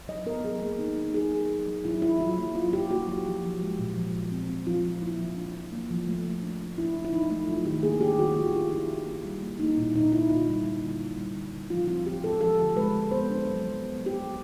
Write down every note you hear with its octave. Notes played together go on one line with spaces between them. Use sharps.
F#3 D#5
B3 A#4
F#3 G#4
A#3
D#4
D#4
D#4 G#4
F#3
F#3
F#3
F#3 E4
F#3 E4
F#3 F4
A#3
F#3 F4
F#3 G4
A#3 F#4
F#3 F#4
F3
F3
G#3
A#2
F3
A#2
C4
C4
F3 F4
F3
A#3 E4
F3
D4
D4
A#3
F3
A3
A3
D4
D4
D4 E4
D4
E4
F3 D#4
A3 E4
F#3 F4
D#3 G4
A#3 G#4
D4 G4
D#3 F#4
D#3 F4
D4 F4
D4 E4
D#4
A#3
G3
A#3
A#3 D#4
A#2 E4
A#2 D#4
D#4 E4
D3 F4
G3
A#3
D3
D3
G3
D3
D3
F3 F4
C4 F4
C4 G4
G#3 A4
F3 A4
D3
G#3 B4
D3
B3 C5
D4
F#3
B3
B3
F#3
G4
B3